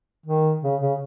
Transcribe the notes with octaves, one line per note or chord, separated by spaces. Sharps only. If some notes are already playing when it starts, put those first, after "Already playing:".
D#3
C#3
C#3